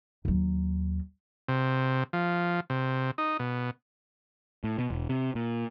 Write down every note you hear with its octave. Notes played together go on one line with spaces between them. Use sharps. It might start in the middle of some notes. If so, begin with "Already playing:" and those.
D#2 F#3
C3
F3
C3
D#4
B2
A2
B2
E1
C3
A#2